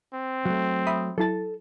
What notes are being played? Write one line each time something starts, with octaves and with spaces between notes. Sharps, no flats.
C4
F#3 A3
E5 B5 D#6
F#3 E4 A4 A5 A6